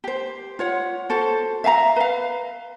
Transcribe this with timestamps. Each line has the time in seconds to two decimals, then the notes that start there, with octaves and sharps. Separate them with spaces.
0.04 G4 C5
0.59 F4 C#5 F#5
1.09 F#4 A4 C5
1.64 E5 F5 G#5 A#5
1.96 B4 F5